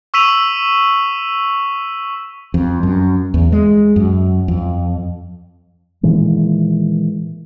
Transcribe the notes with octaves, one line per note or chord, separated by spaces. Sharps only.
C#6 E6 B6 D#7 F7 F#7
F2
F#2
E2
G#3
F#2
F2
A#2 D#3 E3 G#3